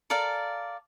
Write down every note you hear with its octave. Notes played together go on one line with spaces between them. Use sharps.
A4 A#4 D5 F5